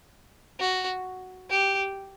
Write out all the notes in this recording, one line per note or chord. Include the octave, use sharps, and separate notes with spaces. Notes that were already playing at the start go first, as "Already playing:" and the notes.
F#4
G4